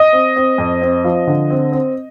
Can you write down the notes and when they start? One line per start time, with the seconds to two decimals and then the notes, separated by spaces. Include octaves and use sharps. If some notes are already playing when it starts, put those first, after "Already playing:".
Already playing: D#5 D#6
0.13 C4
0.36 C4
0.58 F2
0.82 C4
1.04 F3
1.27 D3
1.50 C4
1.72 C4